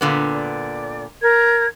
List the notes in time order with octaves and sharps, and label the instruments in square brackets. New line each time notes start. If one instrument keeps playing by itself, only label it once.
[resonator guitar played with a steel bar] A#2 D3 B3
[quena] D5
[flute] A#4 [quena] G#6